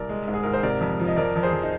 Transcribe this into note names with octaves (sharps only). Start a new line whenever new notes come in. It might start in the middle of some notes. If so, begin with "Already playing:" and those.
Already playing: C2 A#4 D5
G#3
G#2
G#4
G#2 A#4
C5
C3 A#4 D5
F2
F3
D#5
F2 A#4 D5
F2
G#4 C5
F2
D#4